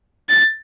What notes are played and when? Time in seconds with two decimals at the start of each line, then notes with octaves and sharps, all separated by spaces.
0.29 A6